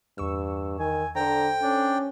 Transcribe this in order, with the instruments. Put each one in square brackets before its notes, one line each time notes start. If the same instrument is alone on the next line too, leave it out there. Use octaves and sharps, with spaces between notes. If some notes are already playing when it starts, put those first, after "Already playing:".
[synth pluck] E2 C#6 E6 [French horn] G2
[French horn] D#3 [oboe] G#5
[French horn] D3 [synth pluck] A4 C5 [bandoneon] G5 [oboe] A#5
[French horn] C#4 [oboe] D4